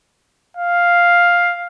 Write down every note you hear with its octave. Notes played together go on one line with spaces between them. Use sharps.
F5